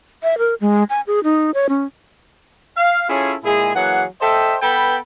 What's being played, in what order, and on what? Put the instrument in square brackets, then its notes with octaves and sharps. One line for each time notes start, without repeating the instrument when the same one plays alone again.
[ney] E5
A#4
G#3
G#5
G#4
D#4
C#5
C#4
[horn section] F5
C#4 E4 F4 G#4 A4 C#5
A#2 G#3 E4 G#4
E3 F#3 A#3 G#4 F#5
A4 C5 D#5 E5 G5
B3 A4 B4 G5 B5